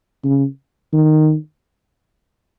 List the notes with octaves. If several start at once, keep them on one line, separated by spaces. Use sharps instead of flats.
C#3
D#3